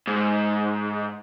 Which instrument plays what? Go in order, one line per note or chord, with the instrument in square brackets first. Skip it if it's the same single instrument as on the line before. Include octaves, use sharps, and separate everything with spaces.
[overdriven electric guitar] G#2